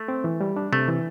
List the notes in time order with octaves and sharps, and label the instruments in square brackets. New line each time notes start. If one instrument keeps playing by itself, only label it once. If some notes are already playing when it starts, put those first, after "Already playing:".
Already playing: [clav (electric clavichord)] A3
[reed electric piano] C4
E3
G3
D4
[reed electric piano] C3 [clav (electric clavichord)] A3
[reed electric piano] E3